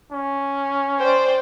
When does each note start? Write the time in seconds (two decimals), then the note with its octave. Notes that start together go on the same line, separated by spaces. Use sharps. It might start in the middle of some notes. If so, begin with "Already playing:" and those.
0.12 C#4
1.00 C5 D5 G5